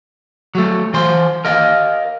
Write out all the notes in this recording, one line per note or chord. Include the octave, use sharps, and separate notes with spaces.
F#3 A3
E3 C5 C6
A#4 D#5 F5